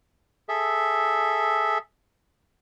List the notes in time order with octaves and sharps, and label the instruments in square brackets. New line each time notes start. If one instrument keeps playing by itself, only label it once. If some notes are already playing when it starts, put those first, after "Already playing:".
[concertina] G#4 A4 E5